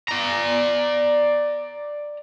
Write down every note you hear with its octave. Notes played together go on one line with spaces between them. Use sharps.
D5 A#5